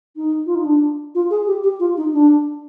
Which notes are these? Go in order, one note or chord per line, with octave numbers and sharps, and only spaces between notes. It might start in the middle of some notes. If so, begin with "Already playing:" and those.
D#4
F4
D#4
D4
F4
G#4
G4
G4
F4
D#4
D4